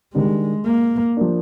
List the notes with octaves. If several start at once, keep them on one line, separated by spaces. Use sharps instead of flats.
D#3 G3 G#3 D4 G4
A#3
F3 A#3 D4